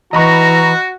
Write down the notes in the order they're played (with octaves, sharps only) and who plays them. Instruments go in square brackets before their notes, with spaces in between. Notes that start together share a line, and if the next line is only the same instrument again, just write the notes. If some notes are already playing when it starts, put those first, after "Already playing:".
[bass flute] E3 [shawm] F#4 [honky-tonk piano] D#5 B5 C#6 [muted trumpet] A#5